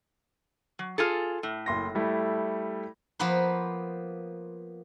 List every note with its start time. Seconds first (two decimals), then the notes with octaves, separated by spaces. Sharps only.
0.79 F#3
0.98 F4 G#4 A4
1.43 A2
1.66 F#1 C6 A#6
1.95 G3 A3 E4
3.19 F3 A#3 B3 B4 C5